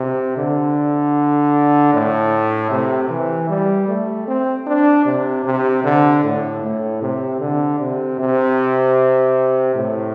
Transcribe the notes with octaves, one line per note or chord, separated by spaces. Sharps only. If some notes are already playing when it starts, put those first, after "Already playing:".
Already playing: C3
D3
A2
C3
E3
G3
A3
C4
D4
C3
C3
D3
A2
A2
C3
D3
C3
C3
A2